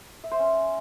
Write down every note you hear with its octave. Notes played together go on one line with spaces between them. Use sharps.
E5
C5
C#4